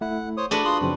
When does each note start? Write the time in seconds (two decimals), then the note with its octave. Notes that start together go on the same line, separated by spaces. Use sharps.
0.01 A3 E4 F#5
0.37 C5 C#5 D#6
0.51 A3 D4 F#4 G#4 B4
0.65 F4 C6 D#6
0.81 F#2 C#3 F3 C4